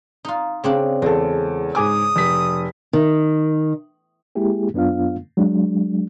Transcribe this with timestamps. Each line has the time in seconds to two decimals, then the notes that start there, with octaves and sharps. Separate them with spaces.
0.25 D#4 F4
0.64 C#3 C4 D4
1.02 E2 G#3 A4
1.75 G#2 G#5 D6 D#6
2.16 F1 B6
2.93 D#3
4.35 G#3 A#3 E4 G4 G#4
4.74 F#2 B3 D4 F4 F5
5.37 F#3 G#3 D4